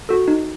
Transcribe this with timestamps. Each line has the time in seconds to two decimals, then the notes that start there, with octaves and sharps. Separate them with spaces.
0.09 F#4 A4
0.28 D#4